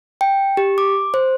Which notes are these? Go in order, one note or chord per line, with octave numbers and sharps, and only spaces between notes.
G5
G4
D6
C5